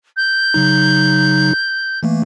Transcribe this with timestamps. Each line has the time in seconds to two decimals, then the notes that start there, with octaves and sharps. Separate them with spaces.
0.17 G6
0.54 C#3 F#3 D#4
2.03 E3 A3 A#3